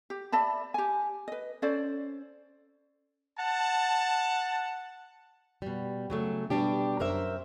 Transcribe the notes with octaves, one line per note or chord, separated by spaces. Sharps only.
G4
D5 E5 A5 B5
G4 G#5
B4 D#5
C#4 A4 C5 D5
F#5 A5
B2 G3
C#3 F#3 A3
B2 G3 D4 G4
F#2 A#4 C5 E5